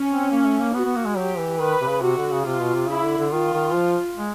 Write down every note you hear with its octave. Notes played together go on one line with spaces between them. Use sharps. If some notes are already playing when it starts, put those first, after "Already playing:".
Already playing: C#4
C4
A#3
A3
A#3
B3 F#4
B3
A#3
G#3
F#3 G4
E3
D#3 B4
C3
C#3
C3 F#4
D3
C#3
C3 F4
B2
C3
C#3 E4
D3
D3
D#3 F4
D#3
F3
G#3